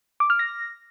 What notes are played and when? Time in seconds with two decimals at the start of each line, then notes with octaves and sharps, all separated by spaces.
0.20 D6
0.30 F6
0.39 A#6